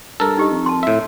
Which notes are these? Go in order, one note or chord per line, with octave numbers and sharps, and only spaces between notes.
G2 A4 A#4
D#4 G4 D#5
F2
A5 C6
A2 E5